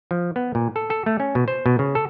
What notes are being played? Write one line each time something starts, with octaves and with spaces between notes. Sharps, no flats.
F3
B3
A#2
A4
A4
A3
C#4
B2
C5
B2
C#3
A4